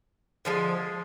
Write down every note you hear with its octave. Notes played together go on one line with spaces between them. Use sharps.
D3 F3 G#3